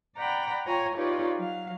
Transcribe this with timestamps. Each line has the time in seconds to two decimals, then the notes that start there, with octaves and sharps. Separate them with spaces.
0.18 D5 F#5 G5 A#5 B5
0.67 F4 C#5 G5 G#5 A#5
0.96 D#4 F4 G4 B4 C#5 D5
1.38 F#3 F5